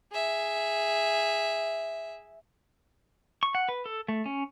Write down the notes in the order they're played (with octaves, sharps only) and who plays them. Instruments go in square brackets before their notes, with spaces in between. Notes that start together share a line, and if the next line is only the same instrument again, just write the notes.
[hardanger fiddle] G#4 E5
[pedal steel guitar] C#6
F#5
B4
A4
A3
C#4